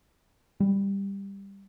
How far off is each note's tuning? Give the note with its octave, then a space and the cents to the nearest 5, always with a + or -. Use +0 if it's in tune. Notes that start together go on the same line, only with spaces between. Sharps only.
G3 +10